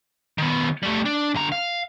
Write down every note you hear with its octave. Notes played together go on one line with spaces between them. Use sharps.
D#3 B3
G3 A3
D4
D3 A#5
F5